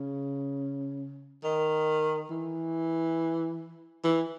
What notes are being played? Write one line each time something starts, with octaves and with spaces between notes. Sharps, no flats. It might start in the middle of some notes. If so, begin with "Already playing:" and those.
Already playing: C#3
D#3
E3
E3